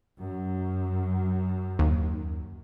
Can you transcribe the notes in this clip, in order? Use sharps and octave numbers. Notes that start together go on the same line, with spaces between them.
F#2
D#2